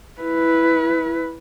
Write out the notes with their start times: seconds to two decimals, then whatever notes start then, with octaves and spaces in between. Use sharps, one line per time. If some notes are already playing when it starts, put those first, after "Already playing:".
0.21 E4 B4